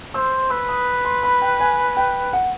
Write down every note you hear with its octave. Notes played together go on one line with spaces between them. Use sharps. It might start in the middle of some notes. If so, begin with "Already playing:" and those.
C5 E6
B4 E6
D#6
C6
B5
G5
G#5
G5
F#5